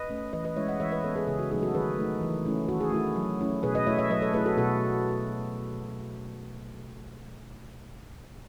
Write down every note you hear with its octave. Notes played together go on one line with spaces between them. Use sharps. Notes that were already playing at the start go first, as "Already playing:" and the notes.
Already playing: B4 D#5
A3 C#4
E3 B4 D#5
B4 D#5
G#3 C#4 E4 C#5 E5
D#5 F#5
E3 C#5 E5
B4 D#5
B3 E4 A4 C#5
G#4 B4
C#3 G#4
F#4
F#3 A3 D#4 G#4
F#4 A4
D#3 G#4 B4
A3 D#4
E3
A3 C#4 E4
D#3 F#4 A4
G#4
A3 E4 F#4
F#3
A3 C#4 E4
B2 G#4 B4
B4 D#5
A3 E4 C#5 E5
C#5 E5
F#3 B4 D#5
A4 C#5
A3 E4 G#4 B4
F#4 A4
B2 F#4 A4